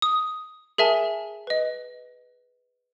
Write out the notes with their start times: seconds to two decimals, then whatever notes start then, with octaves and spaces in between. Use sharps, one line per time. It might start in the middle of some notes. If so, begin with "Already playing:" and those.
0.02 D#6
0.78 G#4 A#4 E5 G#5 A5
1.47 B4 D#5